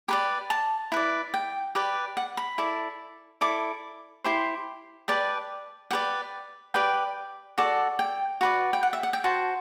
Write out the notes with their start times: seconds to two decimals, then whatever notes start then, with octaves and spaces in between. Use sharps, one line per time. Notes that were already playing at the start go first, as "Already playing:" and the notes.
0.08 G4 B4 D5 B5
0.50 A5
0.92 E4 B4 D5
1.34 G5
1.75 G4 B4 D5
2.17 F#5
2.37 B5
2.58 E4 A4 D5
3.41 E4 A4 D5 D6
4.24 E4 G4 C5 C6
5.08 G4 B4 D5 A5
5.91 G4 B4 D5 F#5
6.74 G4 B4 D5 G5
7.58 F#4 A4 D5
7.99 G5
8.41 F#4 B4 D5
8.73 G5
8.83 F#5
8.93 E5
9.03 F#5
9.13 G5
9.24 F#4 C5 A5